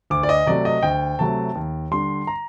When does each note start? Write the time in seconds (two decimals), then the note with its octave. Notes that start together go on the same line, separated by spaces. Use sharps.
0.10 D2 D6
0.23 D5
0.29 D#5
0.46 C3 F#3 A3 D5
0.65 D#5
0.83 D2 G5
1.19 C3 F#3 A3 A5
1.55 D#2
1.91 D3 G3 C6
2.27 A#5